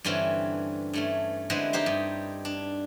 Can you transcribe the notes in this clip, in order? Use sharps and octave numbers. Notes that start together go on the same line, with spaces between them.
G2 D3 E3 C4 C#4
G2 A3 C#4
D3 G#3 C4 E4 B4 C5
D#4 E4 G4 C5
G2
D4